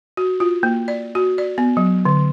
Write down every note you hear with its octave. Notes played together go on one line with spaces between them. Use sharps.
F#4
F4
A#3
D5
F#4
D5
B3
F#3
D3